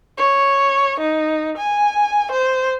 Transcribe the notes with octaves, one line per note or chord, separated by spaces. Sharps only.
C#5
D#4
G#5
C5